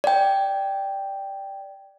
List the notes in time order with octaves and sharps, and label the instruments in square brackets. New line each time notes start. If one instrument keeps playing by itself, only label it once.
[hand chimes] D5 G5